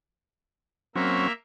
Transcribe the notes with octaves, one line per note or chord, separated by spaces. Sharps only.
F#3 A#3 C4 C#4 A#4 E5